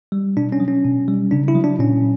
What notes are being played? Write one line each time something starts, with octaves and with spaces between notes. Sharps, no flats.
G3
B2 D4
C#4
F#3
C#4
B2
G3
C#3 D4
E4
F#3
D4
A#2 C#4